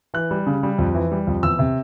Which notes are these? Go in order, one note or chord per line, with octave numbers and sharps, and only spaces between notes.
E3 F#6
G3
C#3
G3
F2
E3
G3
F2
E2 E6
C3